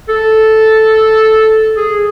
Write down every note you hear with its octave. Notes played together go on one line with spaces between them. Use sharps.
A4
G#4